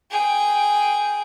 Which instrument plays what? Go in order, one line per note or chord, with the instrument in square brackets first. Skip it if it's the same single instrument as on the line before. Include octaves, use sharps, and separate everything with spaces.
[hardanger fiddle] G#4 G5